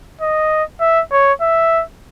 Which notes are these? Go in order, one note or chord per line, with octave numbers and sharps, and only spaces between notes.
D#5
E5
C#5
E5